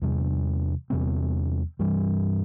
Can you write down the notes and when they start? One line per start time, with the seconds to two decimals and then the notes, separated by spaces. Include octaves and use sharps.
0.02 E2 C3 G3
0.90 E2 C3 G3 C4
1.79 G2 E3 G3